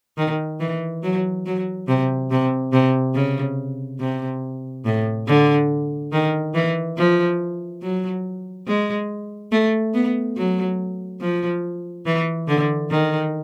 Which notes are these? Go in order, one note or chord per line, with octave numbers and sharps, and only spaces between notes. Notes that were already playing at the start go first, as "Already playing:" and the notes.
D#3
E3
F#3
F#3
C3
C3
C3
C#3
C3
A2
D3
D#3
E3
F3
F#3
G#3
A3
B3
F#3
F3
E3
D3
D#3